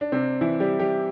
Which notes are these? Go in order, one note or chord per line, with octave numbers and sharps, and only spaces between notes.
D4
C3 C4
E3 E4
G3 G4
G3 G4